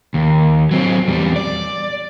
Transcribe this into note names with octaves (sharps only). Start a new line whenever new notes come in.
D#2
F#3 C4
E2 G3
D5